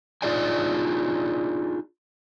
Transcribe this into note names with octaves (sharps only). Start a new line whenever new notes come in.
D4 D#4 F4 G#4 D5 G#5